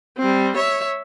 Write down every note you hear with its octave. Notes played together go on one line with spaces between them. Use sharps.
G3 C4
C#5 E5